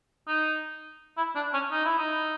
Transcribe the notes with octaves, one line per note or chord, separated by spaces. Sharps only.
D#4
E4
D4
C#4
D#4
E4
D#4